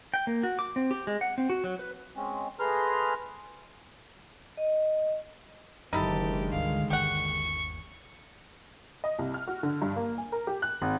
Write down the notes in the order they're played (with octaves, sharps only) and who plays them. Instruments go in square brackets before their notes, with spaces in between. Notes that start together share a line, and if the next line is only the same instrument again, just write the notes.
[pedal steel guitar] G5
A#3
F#4
D6
C4
G4
G#3
F#5
C4
F#4
F#3
B4
[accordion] G#3 C4 C#4
A3 G#4 B4 A#5 C6 F6
[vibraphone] D#5
[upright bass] F#1 [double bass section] D3 D#3 G#3 [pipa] D#4 E4 A4 [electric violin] G4
[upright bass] C#2 G2 [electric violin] F5
[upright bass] G1 D#2 [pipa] G4 F#5 [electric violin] C#6
[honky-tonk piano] D#5
C2
F6
F#4
D3
G2
A#3
G#5
A#4
G4
F#6
G#1